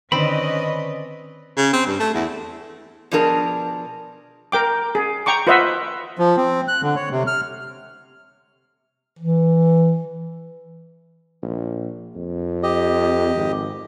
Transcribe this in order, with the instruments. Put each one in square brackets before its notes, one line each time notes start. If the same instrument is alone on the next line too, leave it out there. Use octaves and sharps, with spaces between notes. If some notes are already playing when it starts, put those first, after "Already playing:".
[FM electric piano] D3 D#3 [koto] C4 [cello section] C#4 B4 D#5 [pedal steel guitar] D5 B5
[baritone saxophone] C#3
C4
G2
A3
E2
[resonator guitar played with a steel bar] B2 F3 D4 G#4 A#4 A5
[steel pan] A#4 G5 D6
G#4
G5 A#5 C#6 D6
F4 B4 C5 D#5 E5 F#5
[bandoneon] F3
C4
F#6
D3
C#5
C3
F6
[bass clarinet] E3
[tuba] A#1
F2
[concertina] G4 D#5
[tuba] G#1